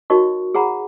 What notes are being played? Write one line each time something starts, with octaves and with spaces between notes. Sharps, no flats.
D#4 F#4 A#4 C#5 D#5 C#6
G#4 C#5 F#5 A#5 B5